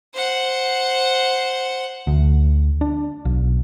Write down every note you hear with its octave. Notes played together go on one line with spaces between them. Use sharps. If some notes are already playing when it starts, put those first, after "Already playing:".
C5 F#5
D2
D4
B1